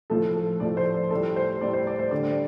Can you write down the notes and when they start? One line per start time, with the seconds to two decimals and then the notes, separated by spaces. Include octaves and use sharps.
0.10 A2 F3 A3 A4
0.36 A4
0.60 A2 F3 A3 D5
0.77 C5
0.94 D5
1.11 A2 G3 A4
1.36 C5
1.61 A2 G3 D5
1.73 C5
1.87 D5
1.99 C5
2.11 D3 G3 D5